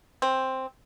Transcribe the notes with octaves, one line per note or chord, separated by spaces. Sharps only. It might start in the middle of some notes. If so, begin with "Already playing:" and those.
C4